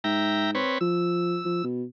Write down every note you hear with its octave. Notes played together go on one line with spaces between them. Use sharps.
G#2 E5 G5 A#5
C4 B4 C#5
F3 E6
F3
B2